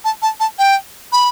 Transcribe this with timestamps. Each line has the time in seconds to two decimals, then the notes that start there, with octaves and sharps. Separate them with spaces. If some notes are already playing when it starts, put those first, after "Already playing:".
0.05 A5
0.22 A5
0.40 A5
0.59 G5
1.12 B5